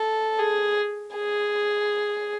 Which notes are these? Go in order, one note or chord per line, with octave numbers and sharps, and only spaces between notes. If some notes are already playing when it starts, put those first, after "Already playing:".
Already playing: A4
G#4
G#4